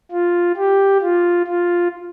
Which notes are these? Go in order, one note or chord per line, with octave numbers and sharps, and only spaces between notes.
F4
G4
F4
F4